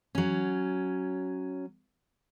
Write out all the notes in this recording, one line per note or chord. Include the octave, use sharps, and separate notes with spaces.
F#3 C#4